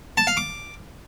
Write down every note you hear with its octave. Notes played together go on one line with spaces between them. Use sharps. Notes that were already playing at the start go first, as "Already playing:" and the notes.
A5
F5
D6